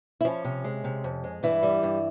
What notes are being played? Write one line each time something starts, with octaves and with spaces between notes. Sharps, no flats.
E4
F3 C#4
C3
G#3
C3
F2
G#3
G2 E3 E4
G3
G2